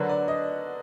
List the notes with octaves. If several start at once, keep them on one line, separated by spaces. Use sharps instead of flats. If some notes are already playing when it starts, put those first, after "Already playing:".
Already playing: D3 F#3 D4 F#4 A#4 B4
D5
D#5